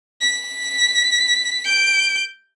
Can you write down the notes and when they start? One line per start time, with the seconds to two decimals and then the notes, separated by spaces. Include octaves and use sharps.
0.21 B6
1.66 G6 D7